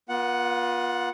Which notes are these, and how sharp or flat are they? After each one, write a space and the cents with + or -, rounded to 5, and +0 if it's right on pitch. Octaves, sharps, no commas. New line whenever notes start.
B3 -40 F4 +20 F#5 +0